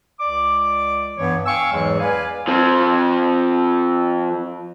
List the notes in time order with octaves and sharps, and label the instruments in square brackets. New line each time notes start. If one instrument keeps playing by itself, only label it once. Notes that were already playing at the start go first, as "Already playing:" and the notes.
[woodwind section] C#2 D5 D6
G2 E3 B3 C#5
F5 G5 G#5 C#6 E6
E2 G#2 E3 F#3 G#3
B4 D5 F5 G#5
[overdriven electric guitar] F3 C4